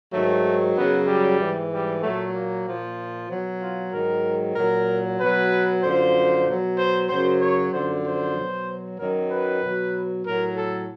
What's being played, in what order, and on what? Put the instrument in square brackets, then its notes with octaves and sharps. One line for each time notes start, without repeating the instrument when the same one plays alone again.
[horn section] G#2 D#3 F#3 A3
F#2 C#3 F#3 B3
G3
G#2 E3
G3
A#2 F#3 A3
A#3
A#2 F3
B2 F#3
F4
G#2 D#3 F#3 A#4
A#2 F#3 A#4
B2 F#3 B4
F#2 D3 F3 C5
B2 F#3
C5
F#2 C#3 F#3 C5
C#5
F#2 D3 F3 C5
C5
B2 F#3
F#2 D#3 F#3 A#4
B4
B2 F#3
A2 F#3 A#4
A4